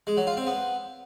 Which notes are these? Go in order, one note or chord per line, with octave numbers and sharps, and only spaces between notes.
G#3
F#3
F4
C4
B3